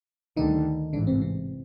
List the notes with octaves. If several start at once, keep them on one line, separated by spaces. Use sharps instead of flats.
D2 D3 D#3 G3 D#4
A1 G#2 D3 E3 D4
C3 C4
C3 C4